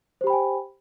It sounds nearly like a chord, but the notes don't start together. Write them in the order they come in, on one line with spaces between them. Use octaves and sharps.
C5 G4 B5 G5 G#5